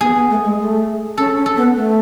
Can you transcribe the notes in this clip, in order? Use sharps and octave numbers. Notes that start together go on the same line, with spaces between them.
B3 G#4
B3
A3
G#3
A3
C#4 A4
C#4
A4
B3
A3